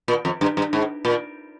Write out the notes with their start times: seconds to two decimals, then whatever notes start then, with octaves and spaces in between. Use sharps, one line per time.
0.08 A#2
0.25 F2
0.41 G2
0.57 G2
0.73 G#2
1.05 A#2